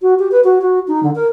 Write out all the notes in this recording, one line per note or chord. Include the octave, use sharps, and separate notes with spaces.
F#4
G4
B4
F#4
F#4
D#4
D3
A#4